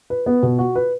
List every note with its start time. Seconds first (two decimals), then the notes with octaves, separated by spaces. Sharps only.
0.10 B4
0.26 B3
0.43 B2
0.59 F#4
0.76 B4